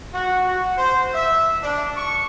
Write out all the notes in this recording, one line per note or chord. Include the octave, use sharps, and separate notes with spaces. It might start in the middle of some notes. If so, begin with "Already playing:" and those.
F#4
F#4
C5
E5
D4
C#6